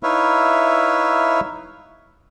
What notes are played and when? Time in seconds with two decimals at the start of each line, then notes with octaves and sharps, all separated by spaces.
0.03 D#4 E4 B4 C#5 E5 F5